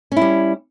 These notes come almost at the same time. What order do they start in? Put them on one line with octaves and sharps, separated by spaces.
C#4 E4 G3